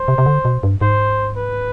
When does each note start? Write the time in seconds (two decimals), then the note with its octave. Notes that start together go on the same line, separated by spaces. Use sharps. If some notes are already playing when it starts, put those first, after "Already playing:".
Already playing: C5
0.08 C3
0.18 C3
0.26 D3
0.45 B2
0.63 G2
0.81 G#2 C5
1.37 B4